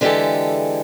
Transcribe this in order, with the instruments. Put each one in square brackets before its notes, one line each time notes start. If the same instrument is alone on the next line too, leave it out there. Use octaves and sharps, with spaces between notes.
[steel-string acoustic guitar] D3 E3 G#3 C4 G4 A4